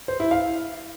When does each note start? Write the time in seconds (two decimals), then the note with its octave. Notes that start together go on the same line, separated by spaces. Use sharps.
0.08 C5
0.20 E4
0.31 F5